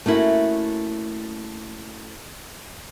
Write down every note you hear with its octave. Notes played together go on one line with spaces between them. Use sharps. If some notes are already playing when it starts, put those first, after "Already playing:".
A3 A#3 C#4 E4 F#4